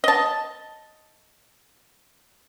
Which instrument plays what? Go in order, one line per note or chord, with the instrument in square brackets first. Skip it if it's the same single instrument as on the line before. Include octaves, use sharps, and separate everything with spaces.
[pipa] D#5 A5